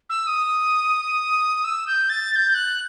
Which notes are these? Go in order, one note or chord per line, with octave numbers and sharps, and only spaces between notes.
E6
D#6
E6
G6
A6
A6
G6
F#6